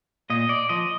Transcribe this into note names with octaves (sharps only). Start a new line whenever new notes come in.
A#2 D#5
D5
F3 D#5